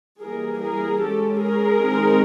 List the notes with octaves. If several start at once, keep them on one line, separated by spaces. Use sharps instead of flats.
E3 G3 A#3 G#4 A#4
G#4 A#4
G#3 C#4 G4 A4
G#4 A#4
D#3 G#3 C4 D#4